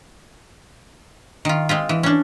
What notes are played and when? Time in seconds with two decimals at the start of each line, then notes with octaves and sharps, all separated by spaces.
1.45 D#3 F4
1.69 G#3 C4 F4
1.89 E3
2.03 C#4 D4